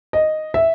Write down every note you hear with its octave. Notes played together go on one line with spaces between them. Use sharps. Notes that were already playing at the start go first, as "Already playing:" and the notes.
D#5
E5